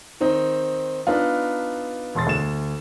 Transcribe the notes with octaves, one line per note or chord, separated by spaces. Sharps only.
D#3 C4 D#4
B3 D4 D#4 F4
E1 C6 A6
D2 E7